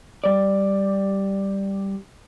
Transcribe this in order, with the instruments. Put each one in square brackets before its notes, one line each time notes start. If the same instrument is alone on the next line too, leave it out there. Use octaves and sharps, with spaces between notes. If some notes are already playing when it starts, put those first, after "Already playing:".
[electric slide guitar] G3 D5